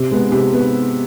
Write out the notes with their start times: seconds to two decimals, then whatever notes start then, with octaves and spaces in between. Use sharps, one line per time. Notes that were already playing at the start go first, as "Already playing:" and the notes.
Already playing: C3
0.11 G#3 B3
0.32 C3
0.53 B3